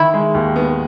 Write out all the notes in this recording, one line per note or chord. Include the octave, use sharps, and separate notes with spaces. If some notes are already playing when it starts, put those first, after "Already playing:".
Already playing: D#3 E4
G#3
D#2
B3